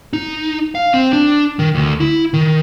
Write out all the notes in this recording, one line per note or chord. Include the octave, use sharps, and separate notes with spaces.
D#4
F5
C4
D4
D#3
D2
E4
D#3